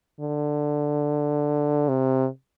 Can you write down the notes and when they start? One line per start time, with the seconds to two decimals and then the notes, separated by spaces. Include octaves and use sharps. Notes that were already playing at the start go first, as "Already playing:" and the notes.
0.20 D3
1.89 C3